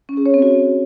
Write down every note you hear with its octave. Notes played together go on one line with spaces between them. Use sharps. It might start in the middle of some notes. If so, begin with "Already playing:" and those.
C#4
G#4
C#5
C4
F#4